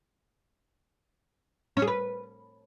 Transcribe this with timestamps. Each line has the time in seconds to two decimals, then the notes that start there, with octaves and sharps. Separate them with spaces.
1.77 C#4
1.82 G#4
1.87 B4